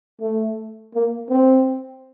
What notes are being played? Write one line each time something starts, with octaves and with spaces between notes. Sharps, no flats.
A3
A#3
C4